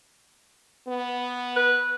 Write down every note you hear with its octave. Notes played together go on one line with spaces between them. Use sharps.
B3
B4